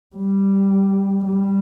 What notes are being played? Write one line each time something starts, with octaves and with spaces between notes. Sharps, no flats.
G3
G3